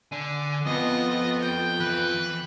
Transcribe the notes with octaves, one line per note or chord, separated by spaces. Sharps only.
D3 G#5
F2 B3 F4 D#5
G5
E3 B4